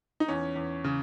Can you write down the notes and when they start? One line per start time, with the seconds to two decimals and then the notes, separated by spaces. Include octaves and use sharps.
0.20 D#4
0.28 E2 C#4
0.56 E2
0.84 C#3